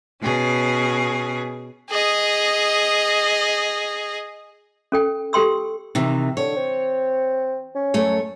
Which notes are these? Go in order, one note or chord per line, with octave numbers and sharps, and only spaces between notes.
B2 C#4 G#4
G#4 D#5
C#4 A4 G5
G4 A4 G5 C6 E6
C3 D#3 E3
D3 C#5
C4
C#4
F#2 A3 C#5